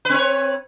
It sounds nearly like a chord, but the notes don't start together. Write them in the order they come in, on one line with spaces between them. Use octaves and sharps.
B4 C4 C#5